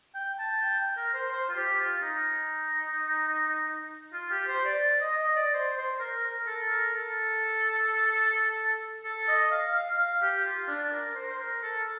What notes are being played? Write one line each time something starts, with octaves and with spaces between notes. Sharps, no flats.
G5
A5
G5
G5
A#4
C5
C5
F4
G4
F4
D#4
F4
G4
C5
D5
D#5
D#5
D5
C5
C5
A#4
A#4
A4
A#4
A4
A4
D#5
F5
F5
F5
G4
F4
D4
A#4
C5
C5
A#4
A4